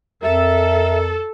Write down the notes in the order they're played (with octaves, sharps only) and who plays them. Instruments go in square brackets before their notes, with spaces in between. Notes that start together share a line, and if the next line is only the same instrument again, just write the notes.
[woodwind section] F2 [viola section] A4 [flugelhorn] A#4 [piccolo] E5